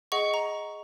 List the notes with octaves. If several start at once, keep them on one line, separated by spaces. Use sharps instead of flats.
G#4 D#5 F#5 C#6
A#5